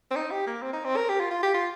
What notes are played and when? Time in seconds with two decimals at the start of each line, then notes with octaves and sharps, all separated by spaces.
0.11 C4
0.16 D#4
0.31 G4
0.47 A#3
0.62 C4
0.73 D#4
0.84 C4
0.96 A#4
1.08 G4
1.20 F4
1.31 F4
1.43 G4
1.54 F4